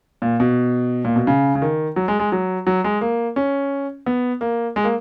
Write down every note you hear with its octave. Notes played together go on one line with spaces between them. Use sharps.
A#2
B2
A#2
B2
C#3
C#3
D#3
F#3
G#3
G#3
F#3
F#3
G#3
A#3
C#4
B3
A#3
G#3
A#3